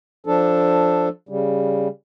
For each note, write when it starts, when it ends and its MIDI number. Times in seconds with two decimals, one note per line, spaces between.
0.26 1.09 53
0.26 1.09 62
0.26 1.09 69
1.29 1.88 49
1.29 1.88 55